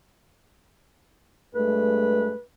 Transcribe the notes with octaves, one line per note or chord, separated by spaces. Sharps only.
G2 G#3 A3 B4